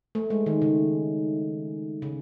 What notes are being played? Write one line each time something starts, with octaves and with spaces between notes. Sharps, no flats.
A3
G#3
D#3
C#3
C#3